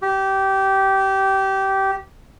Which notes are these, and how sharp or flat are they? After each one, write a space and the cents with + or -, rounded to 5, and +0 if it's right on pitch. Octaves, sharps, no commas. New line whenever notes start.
G4 -20